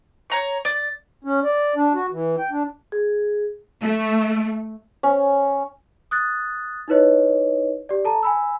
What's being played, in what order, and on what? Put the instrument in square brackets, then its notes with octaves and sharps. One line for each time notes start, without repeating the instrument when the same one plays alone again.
[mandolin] C#5 A#5 C#6
[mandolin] D5 [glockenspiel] A6
[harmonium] C#4
D5
D4
F#4
E3
G5
D4
[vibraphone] G#4
[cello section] A3
[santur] C#4
[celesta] D#6 F#6 A6
D#4 E4 B4 C#5 D#5
G4 D5
A4 A5 A#5
G#5 B5 E6